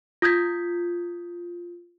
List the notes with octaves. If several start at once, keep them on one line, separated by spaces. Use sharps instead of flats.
F4 D#6 G6 G#6 B6